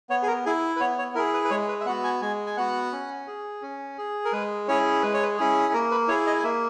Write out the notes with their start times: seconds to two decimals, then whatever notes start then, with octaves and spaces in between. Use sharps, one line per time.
0.10 B3 C#5
0.23 G#4
0.27 A#4
0.45 E4 G#4
0.76 B4
0.80 B3 C#5
0.99 C#5
1.15 E4 G#4 A#4
1.34 B4
1.45 B4
1.50 G#3 C#5
1.69 B4
1.81 E5
1.86 B3 F#4 F#5
2.04 G#5
2.22 G#3 G#5
2.47 G#5
2.57 B3 F#4 F#5
2.92 C#4
3.27 G#4
3.62 C#4
3.98 G#4
4.25 A#4
4.32 G#3 B4
4.68 C#4 E4 G#4 C#5
5.03 G#3 B4
5.14 C#5
5.23 B4
5.38 C#4 E4 G#4
5.73 A#3 A#4
5.91 B4
6.08 E4 G#4 C#5
6.27 D#5
6.43 A#3 E5